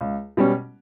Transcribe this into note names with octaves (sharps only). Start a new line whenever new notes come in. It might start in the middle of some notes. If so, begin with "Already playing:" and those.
C#2
B2 G3 C#4